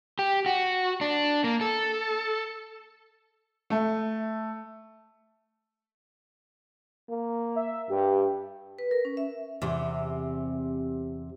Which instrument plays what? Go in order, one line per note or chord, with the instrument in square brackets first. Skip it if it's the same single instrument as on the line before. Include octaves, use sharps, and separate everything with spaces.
[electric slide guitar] G4
F#4
D4
A#3
A4
[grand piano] A3
[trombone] A#3
[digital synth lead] E5
[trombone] G2 [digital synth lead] G4
[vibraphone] B4
A#4
C#4
E5
[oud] E2 C3